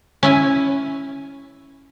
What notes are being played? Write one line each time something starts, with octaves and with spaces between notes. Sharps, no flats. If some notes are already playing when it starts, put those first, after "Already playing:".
C#4 E4 G#5